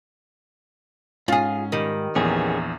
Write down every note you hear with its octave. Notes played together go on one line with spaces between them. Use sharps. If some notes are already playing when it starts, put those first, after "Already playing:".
G#2 C#4 F4 G#4
D#3 G3
A#1 E2 B3 C#4 G#4